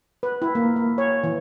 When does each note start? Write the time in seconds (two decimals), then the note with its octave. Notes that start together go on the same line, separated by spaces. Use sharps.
0.23 B4
0.42 E4
0.55 A#3
0.76 A#3
0.98 C#5
1.23 E3